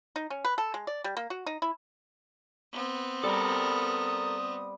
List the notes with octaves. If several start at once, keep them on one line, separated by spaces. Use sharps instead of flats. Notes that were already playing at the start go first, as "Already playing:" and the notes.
D#4
C#4
B4
A4
G#3
D5
G3
A#3
F#4
D#4
E4
B3 C4
G3 A4 A#4 D#6